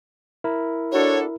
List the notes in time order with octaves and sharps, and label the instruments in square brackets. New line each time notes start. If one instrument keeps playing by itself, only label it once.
[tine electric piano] E4 A#4
[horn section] D4 F#4 A4 [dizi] C#5